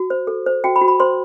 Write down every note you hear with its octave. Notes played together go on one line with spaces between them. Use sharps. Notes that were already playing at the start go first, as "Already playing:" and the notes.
Already playing: F#4
C5
A4
C5
F#4 G5
B5
F#4
B5
C5 C6